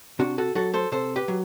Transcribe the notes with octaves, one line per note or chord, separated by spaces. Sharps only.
C3 D4 F#4
F#4 A4
F#3 F#4 A4
A4 C5
C3 A4 C5
G4 B4
F#3